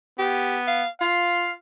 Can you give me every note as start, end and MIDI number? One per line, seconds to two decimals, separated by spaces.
0.19 0.83 59
0.19 0.58 67
0.67 0.89 77
1.01 1.53 65
1.01 1.52 77